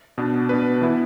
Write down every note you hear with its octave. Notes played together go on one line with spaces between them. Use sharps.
B2 B3 D4
B2 B3 D4 B4
E3 B3 E4